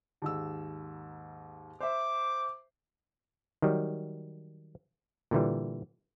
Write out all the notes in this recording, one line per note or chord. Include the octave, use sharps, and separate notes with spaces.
D#2 G#2 E6
C5 E5 D6
D#3 F#3 G3
A#2 D3 E3 G3